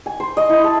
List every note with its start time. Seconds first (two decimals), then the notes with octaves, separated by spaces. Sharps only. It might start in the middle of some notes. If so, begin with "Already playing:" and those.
0.06 G#5
0.20 C5
0.37 D#5
0.49 E4
0.64 A4